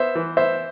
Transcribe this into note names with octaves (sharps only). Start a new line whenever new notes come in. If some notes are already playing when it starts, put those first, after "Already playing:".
Already playing: B3 C5 E5
E3
B3 C5 E5